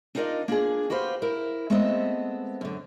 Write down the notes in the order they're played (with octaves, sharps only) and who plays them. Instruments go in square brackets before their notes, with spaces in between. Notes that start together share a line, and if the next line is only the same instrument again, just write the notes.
[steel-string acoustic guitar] D4 D#4 F4 A#4 D5 D#5
A#3 D4 F4 G#4
F#4 G4 B4 C5 F5
E4 A#4
G#3 A3 B3 C4 D#5 E5
F#2 D3